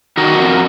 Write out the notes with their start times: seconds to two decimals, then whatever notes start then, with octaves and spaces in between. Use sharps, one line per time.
0.17 D#3 F#4 A#4
0.38 F2